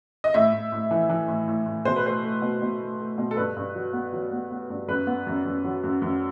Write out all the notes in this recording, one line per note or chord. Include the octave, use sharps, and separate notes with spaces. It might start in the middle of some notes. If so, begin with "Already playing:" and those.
D#5
A2 E5
A2
A2
E3
E3
A2
A2
A2
B2 C5
B4
A3 C5
A3
B2
B2
A3
A3
B2
A4
G2 B4
G2
F#3
B3
F#3
B3
B3
G2
F#2 B4
B3
F#2
F#2
F#3
F#2
F#2